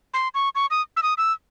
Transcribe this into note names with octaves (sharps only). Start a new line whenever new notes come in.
C6
C#6
C#6
D#6
E6
D#6
E6